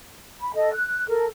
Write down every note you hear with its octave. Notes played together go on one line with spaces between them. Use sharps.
B5
A4 D#5
F#6
A4 A#4